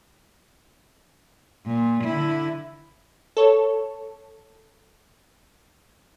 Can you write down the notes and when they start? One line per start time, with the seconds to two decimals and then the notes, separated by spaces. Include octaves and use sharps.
1.67 A#2
2.04 D3 E4
3.37 A4 C#5